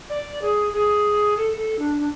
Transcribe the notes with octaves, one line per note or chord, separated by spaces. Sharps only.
D5
G#4
G#4
A4
A4
D4
D4